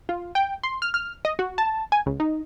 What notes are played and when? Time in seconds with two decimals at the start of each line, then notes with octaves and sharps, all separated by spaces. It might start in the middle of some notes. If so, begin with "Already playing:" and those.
0.09 F4
0.35 G5
0.63 C6
0.82 F6
0.94 F6
1.25 D#5
1.39 F#4
1.58 A5
1.92 G#5
2.06 C#2
2.20 D#4